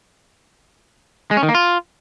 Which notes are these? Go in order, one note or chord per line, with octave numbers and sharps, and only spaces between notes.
G#3
C#4
D#3
A#3
F4